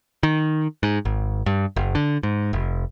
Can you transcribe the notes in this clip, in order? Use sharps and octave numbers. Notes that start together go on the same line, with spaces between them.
D#3
G#2
G#1
G2
F#1
D3
G#2
F1